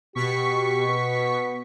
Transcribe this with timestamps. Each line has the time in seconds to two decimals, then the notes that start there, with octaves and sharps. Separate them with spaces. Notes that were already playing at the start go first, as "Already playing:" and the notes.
0.15 B2 G4 C#6 B6
0.87 B3